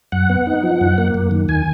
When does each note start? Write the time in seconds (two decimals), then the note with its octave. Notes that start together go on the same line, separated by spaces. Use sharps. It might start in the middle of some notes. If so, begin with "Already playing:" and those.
0.12 F#2 F#5
0.29 B3
0.47 D#4
0.63 F3
0.81 F#2
0.98 A#3
1.14 F#2
1.31 D#3
1.49 D#2 G#5